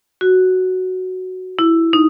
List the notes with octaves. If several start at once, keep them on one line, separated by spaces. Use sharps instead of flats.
F#4
E4
D#4